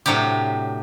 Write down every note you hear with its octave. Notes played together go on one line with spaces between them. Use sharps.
A2 C3 F#3 D4 G4